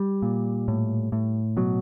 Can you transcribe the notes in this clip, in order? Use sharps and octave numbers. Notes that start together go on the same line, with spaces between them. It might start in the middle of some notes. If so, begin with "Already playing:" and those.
Already playing: G3
A#2
A2
A2
B2 F#3